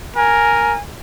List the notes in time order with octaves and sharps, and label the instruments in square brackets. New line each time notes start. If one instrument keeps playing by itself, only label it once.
[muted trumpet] A#4 [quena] G#5